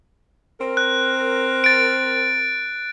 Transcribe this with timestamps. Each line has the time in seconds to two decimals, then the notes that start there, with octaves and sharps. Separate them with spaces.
0.61 C4 A#4
0.77 F#6
1.64 A6 D7